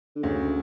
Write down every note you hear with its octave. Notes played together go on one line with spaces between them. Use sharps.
D3
D2 C#3